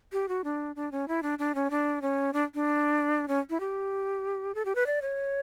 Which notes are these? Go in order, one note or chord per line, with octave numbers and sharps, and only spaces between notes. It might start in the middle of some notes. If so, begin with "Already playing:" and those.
G4
F#4
D4
D4
C#4
E4
D4
D4
C#4
D4
C#4
D4
D4
C#4
E4
G4
A4
G4
B4
D5
C#5